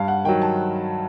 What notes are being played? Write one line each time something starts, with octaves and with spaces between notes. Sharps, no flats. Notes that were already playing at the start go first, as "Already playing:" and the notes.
Already playing: G2 F5
F#5
D#3 F#3 G5
A5